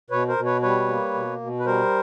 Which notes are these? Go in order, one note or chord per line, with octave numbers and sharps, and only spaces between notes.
B2 B4 C#5
A#4 C5
B2
B4 C#5
G3 B4 C#5
A#3
B2
B2
B4
G3 A#4 C5